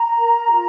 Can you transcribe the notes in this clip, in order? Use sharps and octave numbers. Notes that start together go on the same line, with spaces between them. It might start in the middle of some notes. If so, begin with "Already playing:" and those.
Already playing: A#5
A#4
F4